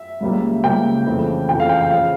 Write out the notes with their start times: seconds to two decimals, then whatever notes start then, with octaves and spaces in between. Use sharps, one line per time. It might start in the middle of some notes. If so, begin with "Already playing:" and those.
Already playing: E5
0.20 C#2 C#3 G3 A#3
0.64 C#2 C#3 G3 A#3 G5
1.06 F2 C#3 E3 A3
1.49 F2 C#3 E3 A3 G5
1.60 F5
1.69 G5
1.81 G5
1.91 C#3 F3 F5